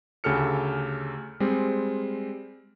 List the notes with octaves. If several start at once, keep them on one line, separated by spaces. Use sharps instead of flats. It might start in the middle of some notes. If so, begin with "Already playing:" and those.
D2 C#3 G4 A4 F6 C#7
G3 G#3 C4